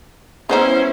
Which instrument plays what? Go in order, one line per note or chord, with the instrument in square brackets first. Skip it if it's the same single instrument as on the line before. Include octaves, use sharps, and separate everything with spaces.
[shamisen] G#3 B3 D#4 [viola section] C#4 E4 [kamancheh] C5